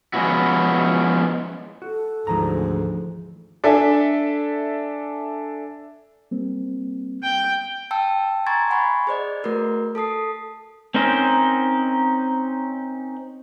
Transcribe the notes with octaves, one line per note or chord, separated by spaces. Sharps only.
F3 G#3 B3 C#4 E4 F#4
F#4 A4
D2 G#2 E3 F3 A#5
D4 A4 E5 G#5
G3 A#3 C4
G5
G5 A5 E6
G#5 A#5 C6 C#6 G#6 A6
F#5 G#5 B5 C#6 G#6
G#4 C5 D5 D#5
A3 F#4 A#4 B4
A4 A5 D#6 C7
C4 C#4 D#4 A#4 C5